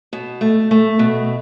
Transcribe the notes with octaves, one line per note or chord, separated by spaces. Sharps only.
B2
A3
A3
B2